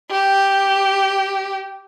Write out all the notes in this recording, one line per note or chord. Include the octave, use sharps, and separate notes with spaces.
G4